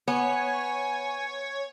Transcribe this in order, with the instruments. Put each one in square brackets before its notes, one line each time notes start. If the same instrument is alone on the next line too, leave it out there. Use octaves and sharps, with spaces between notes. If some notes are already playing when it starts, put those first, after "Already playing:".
[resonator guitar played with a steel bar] B3 [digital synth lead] C#5 [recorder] G#5